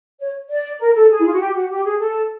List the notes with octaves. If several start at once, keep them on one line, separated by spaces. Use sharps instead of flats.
C#5
D5
A#4
A4
G#4
E4
F4
F#4
G4
F#4
G4
G#4
A4